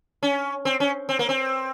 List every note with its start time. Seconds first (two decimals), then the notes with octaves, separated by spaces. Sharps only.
0.23 C#4
0.65 C4
0.80 C#4
1.09 C4
1.19 A#3
1.29 C4